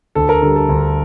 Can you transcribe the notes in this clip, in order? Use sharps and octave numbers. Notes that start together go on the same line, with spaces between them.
D2 A4
A#4
D3 G3 A4
A4
D2